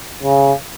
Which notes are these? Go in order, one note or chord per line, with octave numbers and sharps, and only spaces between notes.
C#3